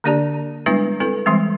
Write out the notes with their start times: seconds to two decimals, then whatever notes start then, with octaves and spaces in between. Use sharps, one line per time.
0.04 D3 A#3 D4 G4 D5 A5
0.66 G3 G#3 B3 D4 E4 B4
1.00 C4 E4 A4 B4
1.26 E3 G3 G#3 C4